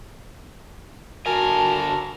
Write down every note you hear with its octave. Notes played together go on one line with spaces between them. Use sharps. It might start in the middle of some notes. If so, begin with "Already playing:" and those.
D3 F#4 A#4 G#5 A5